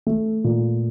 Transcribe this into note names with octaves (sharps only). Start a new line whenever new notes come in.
A3
A#2